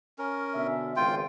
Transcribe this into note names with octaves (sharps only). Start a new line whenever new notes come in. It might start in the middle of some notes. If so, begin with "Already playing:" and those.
C#4 A#4
B2 D3 E5
G#1 C#2 F4 G5